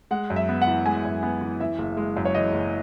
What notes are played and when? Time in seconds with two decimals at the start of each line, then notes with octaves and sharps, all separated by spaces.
0.11 G#3 F#5
0.30 F#2
0.36 E5
0.49 B3
0.62 F#5
0.67 E3
0.86 G#3 G#5
1.05 F#2
1.23 B3
1.41 E3
1.60 E3 E5
1.78 F#1
1.97 G#3
2.17 F#2
2.25 C#5
2.35 E3 D#5
2.53 F#1